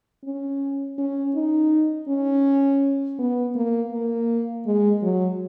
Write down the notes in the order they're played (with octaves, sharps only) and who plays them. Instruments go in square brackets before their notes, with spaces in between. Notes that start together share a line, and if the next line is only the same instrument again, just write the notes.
[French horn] C#4
C#4
D#4
C#4
B3
A#3
A#3
G#3
F#3